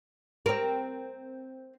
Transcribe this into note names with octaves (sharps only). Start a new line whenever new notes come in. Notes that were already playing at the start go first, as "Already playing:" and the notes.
C4 A#4